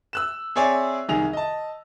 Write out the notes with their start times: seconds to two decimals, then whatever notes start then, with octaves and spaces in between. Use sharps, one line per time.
0.13 E6 F#6 E7
0.56 C4 G#4 C#5 D5 E5 G#5
1.09 C2 D#3 G#4 F7
1.33 D#5 A5